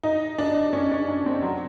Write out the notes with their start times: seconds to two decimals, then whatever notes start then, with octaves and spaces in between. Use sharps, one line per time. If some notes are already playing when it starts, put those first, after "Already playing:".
0.03 D#4
0.38 D4
0.73 C#4
0.91 D4
1.08 D4
1.26 C4
1.42 F#3